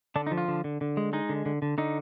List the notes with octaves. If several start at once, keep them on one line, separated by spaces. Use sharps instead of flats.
D3 D4
D#4
F3
F4
D3
D3
D3
G#3
G#3 D#4
D3
D3
D3
D3 D#4